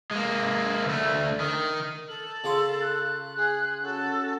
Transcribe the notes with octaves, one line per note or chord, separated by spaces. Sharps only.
G#3 A#3
D2 A3
D#3
A4 F#7
C#3 F4 C6
F#6
G#4
C#4 F#4 A4